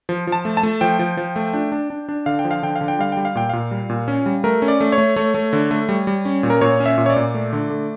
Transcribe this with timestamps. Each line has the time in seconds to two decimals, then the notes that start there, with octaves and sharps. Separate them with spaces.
0.09 F3
0.27 F3
0.32 A5
0.45 A3
0.57 A5
0.63 A3
0.81 F3 G5
0.99 F3
1.17 F3
1.36 A3
1.53 D4
1.72 D4
1.90 D4
2.09 D4
2.26 D3 F5
2.39 G5
2.45 F3
2.51 F5
2.63 D3 G5
2.76 F5
2.81 D3
2.88 G5
2.99 G3 F5
3.12 G3 G5
3.25 F5
3.35 A#2 G5
3.49 A#2 F5
3.71 G3
3.90 A#2
4.08 C#4
4.26 G3
4.44 A3 A#4
4.62 C#4
4.68 D5
4.81 A3
4.92 C#5
4.98 A3
5.16 A3 C#5
5.34 A3
5.53 D3
5.71 A3
5.89 G3
6.07 G3
6.25 C#4
6.43 A#2
6.50 A#4
6.61 A#2 C#5
6.80 C#4
6.86 E5
6.98 A#2
7.06 C#5
7.10 D5
7.16 A#2
7.34 A3
7.53 D3
7.70 A3